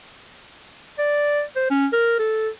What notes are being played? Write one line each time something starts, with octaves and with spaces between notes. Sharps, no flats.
D5
C5
C#4
A#4
A4